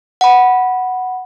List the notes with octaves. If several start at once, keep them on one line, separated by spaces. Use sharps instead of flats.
F#5 B5